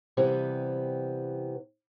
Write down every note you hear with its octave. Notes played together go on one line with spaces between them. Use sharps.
C3 E3 G3 B3